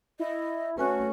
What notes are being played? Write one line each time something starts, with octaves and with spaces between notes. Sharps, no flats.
E4 D#5
A3 C#4 F#4 B4 G#5 F#6